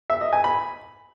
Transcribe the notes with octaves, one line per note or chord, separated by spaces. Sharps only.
E5
D#5
G#5
B5